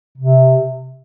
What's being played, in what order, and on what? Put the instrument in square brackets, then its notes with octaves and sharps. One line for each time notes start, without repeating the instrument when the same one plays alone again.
[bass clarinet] C3